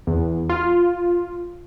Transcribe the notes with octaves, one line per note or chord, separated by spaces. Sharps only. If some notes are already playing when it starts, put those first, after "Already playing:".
E2
F4